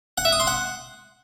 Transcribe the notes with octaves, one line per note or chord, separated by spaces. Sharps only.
F#5
E5
D#6
C6
F#5